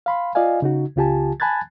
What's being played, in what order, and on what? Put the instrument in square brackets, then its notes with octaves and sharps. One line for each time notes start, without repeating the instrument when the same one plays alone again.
[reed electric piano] F5 B5 C6
F4 D5 D#5 F5 G#5
C#3 D#4 F#4
C#2 C#3 F4 G4 G#5 A5
G#5 A5 B5 F#6 G#6 A6